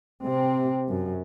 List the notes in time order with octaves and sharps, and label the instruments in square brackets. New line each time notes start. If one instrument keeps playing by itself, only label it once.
[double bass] C3 C4
F#2